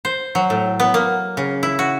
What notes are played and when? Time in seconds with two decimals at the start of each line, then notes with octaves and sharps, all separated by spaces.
0.05 C5
0.35 F#3
0.50 A2
0.80 B3
0.94 A#3
1.37 C#3
1.63 E4
1.79 F#4